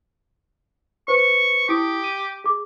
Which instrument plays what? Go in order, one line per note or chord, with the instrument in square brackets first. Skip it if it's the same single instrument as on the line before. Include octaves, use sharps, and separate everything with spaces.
[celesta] B4 C5 [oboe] C#6
[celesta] E4 D#6 D7 [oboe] G4
[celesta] D#7
G#4 D6